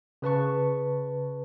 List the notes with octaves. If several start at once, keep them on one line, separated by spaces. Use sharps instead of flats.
C#3 B4 A5 C#6